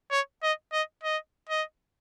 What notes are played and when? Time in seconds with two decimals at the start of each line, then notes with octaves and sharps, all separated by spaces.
0.11 C#5
0.43 D#5
0.73 D#5
1.03 D#5
1.49 D#5